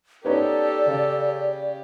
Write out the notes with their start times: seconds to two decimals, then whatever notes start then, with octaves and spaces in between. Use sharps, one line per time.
0.25 B3 C#4 D#4 G4 A4 D5
0.86 C#3